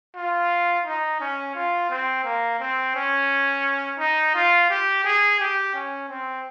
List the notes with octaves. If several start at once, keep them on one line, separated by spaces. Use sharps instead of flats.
F4
D#4
C#4
F4
C4
A#3
C4
C#4
D#4
F4
G4
G#4
G4
C#4
C4